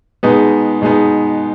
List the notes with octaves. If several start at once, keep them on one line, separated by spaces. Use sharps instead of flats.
B2 G#3 B3 D#4
B2 G#3 B3 D#4